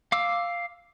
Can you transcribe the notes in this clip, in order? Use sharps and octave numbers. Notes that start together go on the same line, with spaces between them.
F5 D6 E6